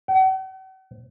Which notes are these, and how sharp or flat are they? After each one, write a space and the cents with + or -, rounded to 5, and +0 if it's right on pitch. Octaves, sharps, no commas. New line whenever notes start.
F#5 +45